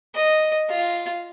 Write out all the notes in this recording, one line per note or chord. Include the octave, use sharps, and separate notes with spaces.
D#5
F4